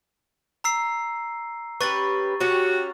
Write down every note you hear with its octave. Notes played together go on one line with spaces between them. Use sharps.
A#5 E6 C7
C#4 G4 B4 C#6 A6
C#4 F#4 G4 C#5